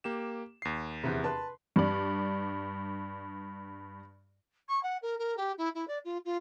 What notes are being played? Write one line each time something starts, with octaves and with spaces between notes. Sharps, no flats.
A#3 G4 E7
D#2 C7
E2 C3
B4 A5 C6
G2 D5
C#6
F#5
A#4
A#4
G4
E4
E4
D5
F4
F4